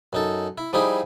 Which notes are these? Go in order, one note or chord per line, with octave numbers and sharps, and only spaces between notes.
F#2 D#4 A4
E4
F3 G3 D#4 E4 G4 G#4